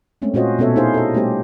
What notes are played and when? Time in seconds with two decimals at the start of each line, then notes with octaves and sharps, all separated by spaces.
0.22 G#3 A3 C4 C#4
0.34 A#2 C#4 F4 F#4 C5 D#5
0.59 B2 B3 C#4 A4 C#5 E5
0.76 D#4 E4 G4 G#4 C5 F5
0.94 A4 D#5
1.14 G3 A3 B3 C#4 G4 C5